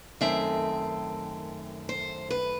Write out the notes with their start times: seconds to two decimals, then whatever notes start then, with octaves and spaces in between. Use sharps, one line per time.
0.21 F#2 D#3 A3 C4 E5
1.89 C5
2.30 B4